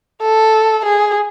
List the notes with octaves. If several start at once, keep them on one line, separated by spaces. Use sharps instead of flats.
A4
G#4